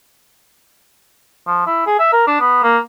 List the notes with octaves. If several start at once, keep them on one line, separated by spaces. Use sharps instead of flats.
F3
E4
G#4
E5
A#4
D4
B3
A#3